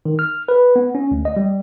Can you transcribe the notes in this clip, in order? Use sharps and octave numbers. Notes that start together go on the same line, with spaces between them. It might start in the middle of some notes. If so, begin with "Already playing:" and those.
D#3
F6
B4
B3
C#4
D2
D#5
G3